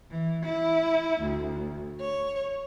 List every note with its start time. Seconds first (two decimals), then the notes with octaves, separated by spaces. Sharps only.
0.10 E3
0.44 E4
1.21 D2
2.00 C#5